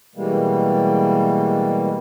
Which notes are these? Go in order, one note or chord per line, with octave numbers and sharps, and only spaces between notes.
B2 E3 G3 G#3 A#3